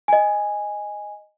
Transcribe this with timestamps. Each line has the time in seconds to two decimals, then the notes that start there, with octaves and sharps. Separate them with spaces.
0.08 D#5 G#5